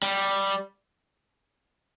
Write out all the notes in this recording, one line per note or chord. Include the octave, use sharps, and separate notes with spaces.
G3